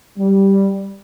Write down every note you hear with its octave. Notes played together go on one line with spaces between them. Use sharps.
G3